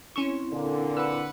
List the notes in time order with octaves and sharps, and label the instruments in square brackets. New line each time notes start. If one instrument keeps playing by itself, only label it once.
[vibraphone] C4 E4 [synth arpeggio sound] C#4 C#6
[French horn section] A#2 D3
[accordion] B4 F#5 [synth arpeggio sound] E6